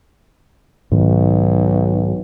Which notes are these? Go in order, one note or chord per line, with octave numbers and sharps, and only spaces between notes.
B1 G#2 D#3